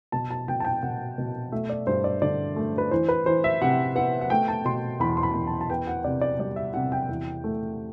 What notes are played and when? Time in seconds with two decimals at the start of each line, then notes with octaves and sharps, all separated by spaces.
0.12 B2 A5
0.31 A5
0.48 B2 G5
0.60 A5
0.65 G5
0.83 B2 F#5
1.18 B2
1.52 A3 E5
1.70 D5
1.87 G2 C5
2.04 D5
2.22 D3 D5
2.56 A3
2.78 B4
2.91 E3 C5
3.09 B4
3.26 E3 C5
3.44 E5
3.62 C3 F#5
3.95 B3 F#5
4.21 F#5
4.30 A3 G5
4.48 A5
4.65 B2 C6
5.00 E2 B5
5.17 C6
5.23 B5
5.35 E2
5.47 A5
5.61 A5
5.70 B3 G5
5.87 F#5
6.04 C3 D5
6.21 D5
6.39 G3 D5
6.56 E5
6.74 C3 F#5
6.92 G5
7.08 E2
7.44 A3